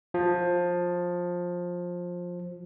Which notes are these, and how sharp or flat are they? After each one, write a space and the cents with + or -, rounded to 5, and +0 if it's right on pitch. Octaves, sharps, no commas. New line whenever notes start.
F3 +15